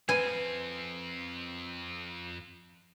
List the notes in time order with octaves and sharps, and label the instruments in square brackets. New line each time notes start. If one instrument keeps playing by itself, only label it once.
[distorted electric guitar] F2 C4 [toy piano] B4 B5 [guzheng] G#5